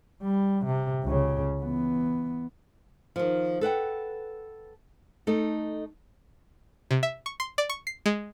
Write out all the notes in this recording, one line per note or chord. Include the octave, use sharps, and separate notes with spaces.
G3
C3
C#2 C#3
E3 B3
D#3 F3
A4 B4 F#5 G5
A3 D#4 A4
C3
E5
C#6
C6
D5
C#6
C7
G#3